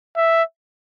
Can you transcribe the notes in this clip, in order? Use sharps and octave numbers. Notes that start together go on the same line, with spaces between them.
E5